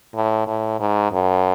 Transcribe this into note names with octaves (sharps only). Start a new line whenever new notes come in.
A2
A2
G#2
F#2